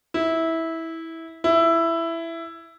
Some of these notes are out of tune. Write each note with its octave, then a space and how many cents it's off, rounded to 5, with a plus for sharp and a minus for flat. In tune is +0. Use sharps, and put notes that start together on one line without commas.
E4 -15
E4 +10